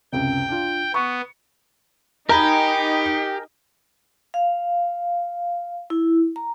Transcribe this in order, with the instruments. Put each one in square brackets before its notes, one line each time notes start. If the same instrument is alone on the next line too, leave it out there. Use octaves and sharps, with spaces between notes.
[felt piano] C#2 F#2 C3 [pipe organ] G5
[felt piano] D4 F4
[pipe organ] B3 [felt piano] C#6
[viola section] D#4 [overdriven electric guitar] G4 [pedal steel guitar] A#4 G5 G#5 [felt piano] A#5 B5
[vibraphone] F5
E4
A#5